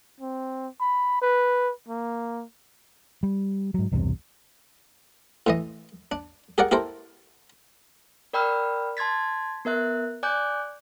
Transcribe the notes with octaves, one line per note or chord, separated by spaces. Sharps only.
C4
B5
B4
A#3
G3
G#2 F#3
B1 E2 G2 C3
A2 E3 D#5
D4
G4 G#4 A#4 D5 F#5
E4 G4 A4 A#4 C5
A#4 D5 G5 B5 E6 F6
A5 C6 G#6 A6 B6
B3 A#4 E5 F#6
D5 G#5 D6 F#6 G6